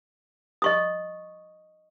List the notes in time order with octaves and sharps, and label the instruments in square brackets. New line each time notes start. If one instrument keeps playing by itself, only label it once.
[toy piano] D#5 C#6 D#6